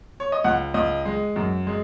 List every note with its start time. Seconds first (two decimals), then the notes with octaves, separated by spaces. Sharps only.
0.20 C#5
0.32 D#5
0.44 C#2 F#5
0.74 C#2 D#5
1.05 G#3
1.36 F#2
1.67 G#3